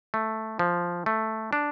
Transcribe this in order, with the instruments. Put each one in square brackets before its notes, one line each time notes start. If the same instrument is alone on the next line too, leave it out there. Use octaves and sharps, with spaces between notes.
[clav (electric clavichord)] A3
F3
A3
D4